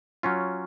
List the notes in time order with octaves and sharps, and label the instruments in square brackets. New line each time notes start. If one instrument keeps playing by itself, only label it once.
[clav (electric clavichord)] F#3 C#4 F4